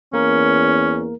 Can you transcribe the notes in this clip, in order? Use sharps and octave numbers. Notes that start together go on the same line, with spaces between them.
E2 A#3 C#4 A#4